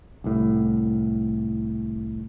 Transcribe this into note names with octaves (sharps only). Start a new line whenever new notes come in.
C2 A2